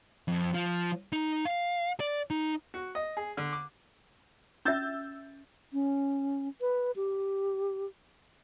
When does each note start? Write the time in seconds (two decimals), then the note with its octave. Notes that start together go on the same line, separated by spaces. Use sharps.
0.28 F2
0.54 F3
1.12 D#4
1.45 F5
2.00 D5
2.30 D#4
2.74 F#4
2.95 D#5
3.17 G#4
3.37 D3
3.53 D6
4.65 C#4 E5 E6 G6 A6
5.73 C#4
6.61 B4
6.96 G4